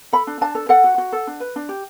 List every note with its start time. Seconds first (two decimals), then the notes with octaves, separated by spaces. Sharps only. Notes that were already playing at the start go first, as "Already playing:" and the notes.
0.13 A4 B5
0.27 D4
0.41 D4 A5
0.55 A4
0.69 A4 F#5
0.84 F#4
0.98 F#4
1.12 A4
1.27 D4
1.40 B4
1.56 D4
1.69 G4